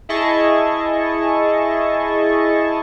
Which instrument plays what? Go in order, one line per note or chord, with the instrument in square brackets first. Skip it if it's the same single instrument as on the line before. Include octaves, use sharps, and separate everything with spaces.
[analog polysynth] E4 G#4 D#5 A5 C#6